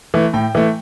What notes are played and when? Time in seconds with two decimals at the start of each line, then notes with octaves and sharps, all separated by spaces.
0.14 E3 A3
0.34 A2 G5
0.55 E3 A3